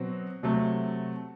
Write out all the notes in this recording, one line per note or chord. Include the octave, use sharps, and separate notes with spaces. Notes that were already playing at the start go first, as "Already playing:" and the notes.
Already playing: B2 F#3 C4
C3 F#3 A3